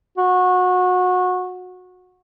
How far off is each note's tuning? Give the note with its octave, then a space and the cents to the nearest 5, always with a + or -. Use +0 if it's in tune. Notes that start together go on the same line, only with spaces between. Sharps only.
F#4 -25